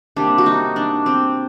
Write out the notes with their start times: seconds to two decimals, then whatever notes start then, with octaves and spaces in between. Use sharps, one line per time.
0.16 C3 G3 A#3 D4
0.38 F#4
0.46 D#4
0.76 D4
1.06 C4